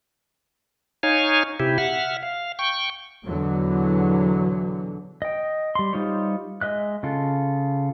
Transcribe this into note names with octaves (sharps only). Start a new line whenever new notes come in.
D#4 C#5 F5 G#5
C3 E4 G4
E5 F#5 F6
F5
G5 C#6
E2 B2 D3 E3 F#3
D#5 G5
G3 C6
G3 D#4 F4 C5 C#5
G#3 D#5 E5 F#6
C#3 F4 A4